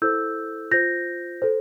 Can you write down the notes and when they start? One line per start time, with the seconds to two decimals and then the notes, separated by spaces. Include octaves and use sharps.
0.02 E4 A4 C5 E6 G6
0.71 F4 C5 G6 A#6
1.42 A4 C5